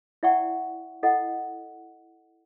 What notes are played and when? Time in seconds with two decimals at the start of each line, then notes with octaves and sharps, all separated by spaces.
0.23 E4 D5 E5 F#5 G5 C#6
1.03 E4 A4 D#5 F#5